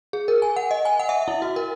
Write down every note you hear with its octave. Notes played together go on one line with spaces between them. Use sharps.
G#4
A#4
G#5
F#5
D#5
G#5
F#5
E5
E4
F#4
A#4